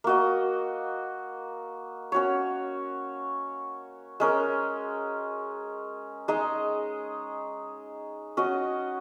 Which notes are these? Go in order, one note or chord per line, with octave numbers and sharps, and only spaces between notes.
A#3 F#4 D#5
C#4 F#4 C#5
G#3 C#4 A#4
G#3 D#4 G#4 D#5
C#4 F#4 D#5